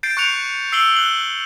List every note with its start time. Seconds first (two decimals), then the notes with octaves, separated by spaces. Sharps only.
0.03 G6 A6 C7 D7
0.17 C#6 F#6 C#7 F7
0.72 E6 C7 D7 F#7 G7
0.94 F#6 F#7 G7